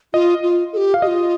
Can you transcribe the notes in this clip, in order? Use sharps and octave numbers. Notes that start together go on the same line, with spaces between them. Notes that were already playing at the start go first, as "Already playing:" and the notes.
F4 D#5
F4
A4
G4
F5
F4 G4 D#5